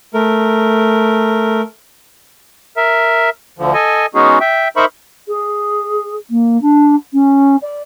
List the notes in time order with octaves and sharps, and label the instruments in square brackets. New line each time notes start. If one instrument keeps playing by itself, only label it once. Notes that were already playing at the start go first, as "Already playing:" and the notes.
[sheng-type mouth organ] A3 A#4
[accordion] A#4 E5
D2 D3 F3
A4 D#5 G#5
G#3 B3 C#4 D#4 F#4 G#4
E5 G5
D#4 A#4 C5 E5 B5 C#6
[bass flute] G#4
A#3
D4
C#4
D5